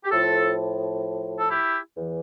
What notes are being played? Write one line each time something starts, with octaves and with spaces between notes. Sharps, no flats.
G4
A2 F3 F4 A4
A4
E4 G4
E2 E3